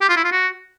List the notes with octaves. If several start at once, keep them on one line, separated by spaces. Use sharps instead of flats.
G4
F4
E4
F4
F#4